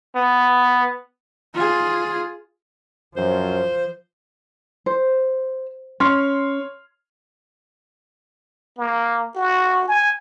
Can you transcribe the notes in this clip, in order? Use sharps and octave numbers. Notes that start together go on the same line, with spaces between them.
B3
F4 G#4
F#2 F3 C5
C5
C#4 C#5 C6 F6
A#3
F#4
G#5